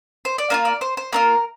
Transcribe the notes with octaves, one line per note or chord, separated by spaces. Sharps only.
C5
D5
A#3 D4 F4 F5
D5
C5
C5
A#3 D4 F4 A#4